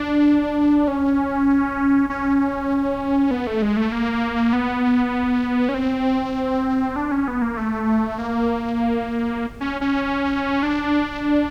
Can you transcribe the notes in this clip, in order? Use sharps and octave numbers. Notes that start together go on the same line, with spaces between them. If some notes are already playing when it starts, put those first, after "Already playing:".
Already playing: D4
C#4
C#4
B3
A3
G#3
A3
A#3
B3
C#4
C4
D4
C#4
B3
A#3
A3
A#3
C#4
C#4
D4